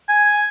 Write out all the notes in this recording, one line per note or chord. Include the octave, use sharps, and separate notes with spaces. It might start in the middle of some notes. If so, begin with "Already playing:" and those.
G#5